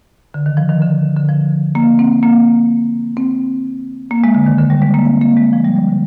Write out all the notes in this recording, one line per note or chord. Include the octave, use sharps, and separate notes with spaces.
D3
D#3
F3
D#3
D3
D3
F3
A#3
C4
A#3
C4
A#3
G#3
D3
D#3
D3
G3
G#3
A#3
C4
A#3
G#3
F3
G3
G3
D3